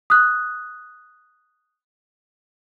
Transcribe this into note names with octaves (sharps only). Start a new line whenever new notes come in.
D#6 F#6